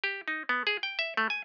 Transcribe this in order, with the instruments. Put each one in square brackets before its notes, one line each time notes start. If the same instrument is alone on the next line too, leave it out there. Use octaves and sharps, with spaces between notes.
[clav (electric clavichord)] G4
D#4
B3
G#4
G5
E5
A3
G#5